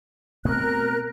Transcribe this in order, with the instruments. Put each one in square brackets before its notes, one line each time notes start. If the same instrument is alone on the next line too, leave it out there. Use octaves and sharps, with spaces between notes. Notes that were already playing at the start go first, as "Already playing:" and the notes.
[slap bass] B2 A3 C4 [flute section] A#4 F#6